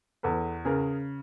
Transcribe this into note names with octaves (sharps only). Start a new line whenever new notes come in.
E2 A4 B4
C#3 G#4 A#4